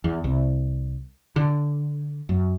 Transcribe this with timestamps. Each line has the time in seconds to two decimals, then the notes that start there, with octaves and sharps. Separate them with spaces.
0.04 E2
0.24 C2
1.36 D3
2.29 F#2